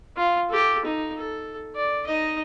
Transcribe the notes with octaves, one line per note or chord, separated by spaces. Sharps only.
F4
G4 A4
D#4
A4
D5
D#4 D#5